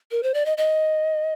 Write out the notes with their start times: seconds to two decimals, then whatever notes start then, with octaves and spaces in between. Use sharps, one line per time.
0.11 A#4
0.23 C5
0.34 D5
0.46 D#5
0.57 D#5